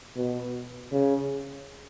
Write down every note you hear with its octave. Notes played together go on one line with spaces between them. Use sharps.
B2
C#3